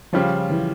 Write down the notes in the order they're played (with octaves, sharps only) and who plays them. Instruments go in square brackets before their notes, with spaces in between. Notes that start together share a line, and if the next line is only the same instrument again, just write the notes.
[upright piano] C#3 G3 C#4 F4 [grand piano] F3
[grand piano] E3